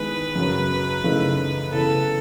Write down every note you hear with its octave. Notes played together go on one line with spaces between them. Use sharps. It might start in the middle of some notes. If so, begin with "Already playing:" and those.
Already playing: D#3 G#3 B3 E4 G#4 B4
F#2 C#3 F#3
F#2 C#3 E3 A3 D#4
C#3 E3 B3 A4